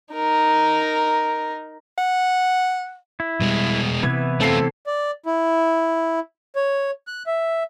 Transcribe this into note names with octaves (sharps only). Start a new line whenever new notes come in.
D#4 A#4
F#5
E4
B2 G3 G#3
C3 E3 B3 E4 G#6
A3 C4 F4 A4 C7
D5
E4
C#5
F#6
E5